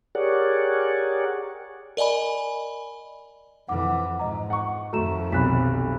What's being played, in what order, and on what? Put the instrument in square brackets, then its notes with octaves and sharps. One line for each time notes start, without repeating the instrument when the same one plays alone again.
[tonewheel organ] G4 G#4 A#4 C#5 D5 F#5
[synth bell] A#4 D5 D#5 G#5 B5
[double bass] F2 E3 [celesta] F#5 D6
[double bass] G#2 [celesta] D#5 A#5
[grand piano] F#5 C#6
[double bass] F2 D#3 [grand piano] A3 [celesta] F#4 A#5 E7
[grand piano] B1 C3 [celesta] B5 F#6 B6